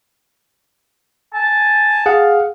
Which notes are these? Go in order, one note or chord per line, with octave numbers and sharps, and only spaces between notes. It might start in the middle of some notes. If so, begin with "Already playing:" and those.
G#5 A5
G#4 F5 F#5